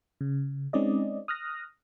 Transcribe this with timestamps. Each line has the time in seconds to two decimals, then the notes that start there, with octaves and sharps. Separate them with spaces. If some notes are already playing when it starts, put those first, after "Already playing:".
0.21 C#3
0.73 G#3 C4 C#4 D#4 D5 D#5
1.28 D#6 F6 F#6 A#6